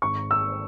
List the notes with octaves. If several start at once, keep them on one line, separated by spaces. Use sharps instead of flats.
G#1 C#6
E6